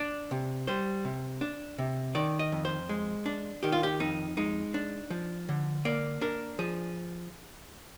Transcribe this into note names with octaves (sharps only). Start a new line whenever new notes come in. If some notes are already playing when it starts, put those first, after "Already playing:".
Already playing: D4 D5
C3
G3 C5
C3
D4
C3
D#3 D5
D#5
F2
C5
G#3
D4
D#3 G4
F4
G4
F2 D#4
G#3 D#4
D4
F3
D3
A#3 D5
D4 A#4
F3 G#4